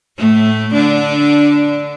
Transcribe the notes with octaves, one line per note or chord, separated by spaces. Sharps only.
A2 A3
D3 D4